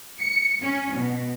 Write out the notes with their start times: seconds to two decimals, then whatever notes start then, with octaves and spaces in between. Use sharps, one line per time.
0.20 C#7
0.64 C#4
0.97 B2